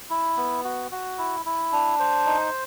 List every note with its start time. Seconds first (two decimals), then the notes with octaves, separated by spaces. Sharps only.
0.10 E4
0.37 B3
0.64 F#4
0.91 F#4
1.18 E4
1.46 E4
1.72 D4
1.99 C5
2.26 D#4